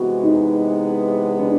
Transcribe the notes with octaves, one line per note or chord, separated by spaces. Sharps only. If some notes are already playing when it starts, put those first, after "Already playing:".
Already playing: C3 E3 G#3 B3 F#4
D#4
D4